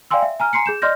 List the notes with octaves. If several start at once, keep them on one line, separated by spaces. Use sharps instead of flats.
D5 F5 G5 G#5 C6 E6
E5
G#5 A#5 F6
G#5 A#5 C6 C7 C#7
G#4 G6 E7
D5 D#5 C6 F6 G6 A#6